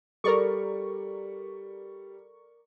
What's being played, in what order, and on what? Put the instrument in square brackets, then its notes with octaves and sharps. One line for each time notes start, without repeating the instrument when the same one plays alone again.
[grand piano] G3 [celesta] A4 [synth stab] A#4 D5 C#6